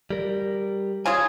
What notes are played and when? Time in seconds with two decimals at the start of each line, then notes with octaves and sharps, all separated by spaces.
0.10 G3 A#4
1.06 C#3 F4 G#4 C5 G#5